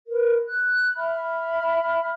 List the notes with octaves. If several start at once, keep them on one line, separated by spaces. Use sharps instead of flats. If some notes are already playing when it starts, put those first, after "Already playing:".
A#4 B4
F#6
E5 B5 F6